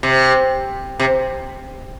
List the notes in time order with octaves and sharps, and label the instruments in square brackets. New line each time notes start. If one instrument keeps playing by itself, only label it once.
[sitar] C3
C3